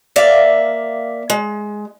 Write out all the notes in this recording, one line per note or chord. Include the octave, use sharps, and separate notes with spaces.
A#3 D5 E5 F5
G#3